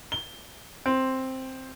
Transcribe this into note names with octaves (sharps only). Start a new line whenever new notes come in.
G7
C4